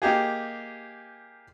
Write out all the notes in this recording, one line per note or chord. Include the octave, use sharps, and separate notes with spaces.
A#3 D#4 G4 G#4